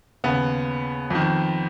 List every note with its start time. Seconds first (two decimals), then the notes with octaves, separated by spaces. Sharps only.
0.24 D#2 C#3 B3
1.10 F2 D#3